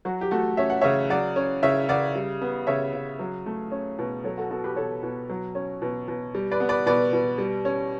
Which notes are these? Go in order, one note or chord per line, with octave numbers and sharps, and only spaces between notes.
F#3 F#4
G4
A3 F#4 A4
C#4 E5
F#5
C#3 C#5 E5
F#3 D5 F#5
C#4
C#3 C#5 E5
C#3 D5 F#5
G3
B3
C#3 C#5 E5
C#3
F#3
A3
C#4
B2
F#3 A4 C#5
F#4 A4
B3 F#4 A4
G4 B4
B2 A4 C#5
B2
F#3
C#4
B2
B2
G3
B4 D5
B3
B4 D5
B2 B4 D5
B2
G3
C#4